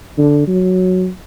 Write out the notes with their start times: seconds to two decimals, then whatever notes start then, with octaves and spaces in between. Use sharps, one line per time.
0.18 D3
0.48 F#3